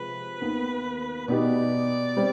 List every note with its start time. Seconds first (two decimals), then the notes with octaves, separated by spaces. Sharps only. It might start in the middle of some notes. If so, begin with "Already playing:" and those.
Already playing: C3 F3 G#3 B4
0.41 D#2 D#3 B3
1.28 B2 B3 D#4 G4 D5
2.17 G3 C4